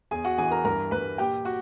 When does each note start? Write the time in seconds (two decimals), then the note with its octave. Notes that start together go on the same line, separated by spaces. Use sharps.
0.11 E2 G#4 G#5
0.25 F#4 F#5
0.38 E3 G#4 G#5
0.51 A#4 A#5
0.64 G2 A#4 A#5
0.91 G2 B4 B5
1.18 A#2 G4 G5
1.45 F#4 F#5